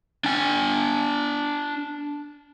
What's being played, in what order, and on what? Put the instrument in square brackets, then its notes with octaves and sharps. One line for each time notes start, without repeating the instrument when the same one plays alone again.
[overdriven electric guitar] D4 G#5